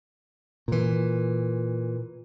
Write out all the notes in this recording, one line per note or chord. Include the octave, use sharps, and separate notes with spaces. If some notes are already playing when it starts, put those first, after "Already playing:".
A#2 E3